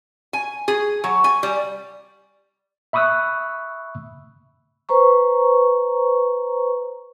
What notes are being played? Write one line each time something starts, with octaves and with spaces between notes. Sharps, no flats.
G#5
G#4
F#3
G#5
G3
E5 B5 C#6 D#6 E6 F#6
B4 C5 A#5 C#6